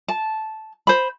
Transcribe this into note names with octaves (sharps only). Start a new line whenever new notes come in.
A5
C5 B5